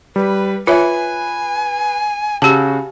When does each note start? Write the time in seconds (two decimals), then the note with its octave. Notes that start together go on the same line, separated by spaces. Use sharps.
0.16 G3 B4
0.67 F4 B4 C#5 E5 G#5
2.42 C#3 F#4 G4 A5